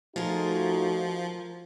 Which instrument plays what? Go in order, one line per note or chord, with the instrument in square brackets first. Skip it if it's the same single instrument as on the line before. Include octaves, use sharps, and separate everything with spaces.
[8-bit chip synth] F3 [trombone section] A3 D#4 F#4 [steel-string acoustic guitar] F4 G#4 A#4